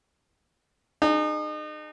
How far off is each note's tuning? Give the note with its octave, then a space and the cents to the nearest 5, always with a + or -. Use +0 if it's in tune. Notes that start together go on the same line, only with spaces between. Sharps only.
D#4 -35 G#4 +10